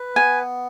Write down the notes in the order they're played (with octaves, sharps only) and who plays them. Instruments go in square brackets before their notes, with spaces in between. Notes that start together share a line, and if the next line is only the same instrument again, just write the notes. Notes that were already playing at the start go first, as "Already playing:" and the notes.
Already playing: [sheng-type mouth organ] B4
[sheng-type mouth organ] B3 [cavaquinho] G#5